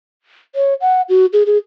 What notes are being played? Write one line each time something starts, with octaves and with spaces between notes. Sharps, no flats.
C#5
F#5
F#4
G#4
G#4